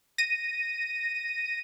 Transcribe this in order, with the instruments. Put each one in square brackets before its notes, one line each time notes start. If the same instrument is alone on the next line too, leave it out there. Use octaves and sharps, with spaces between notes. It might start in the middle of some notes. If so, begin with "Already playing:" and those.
[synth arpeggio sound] A#6 D#7